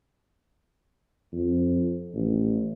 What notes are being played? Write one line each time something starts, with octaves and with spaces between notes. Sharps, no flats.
F2
A1